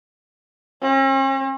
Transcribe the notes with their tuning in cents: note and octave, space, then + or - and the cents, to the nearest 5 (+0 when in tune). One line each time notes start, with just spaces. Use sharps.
C#4 -45